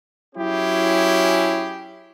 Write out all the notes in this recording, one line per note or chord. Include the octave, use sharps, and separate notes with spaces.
F#3 C#4 E4 G4 G#4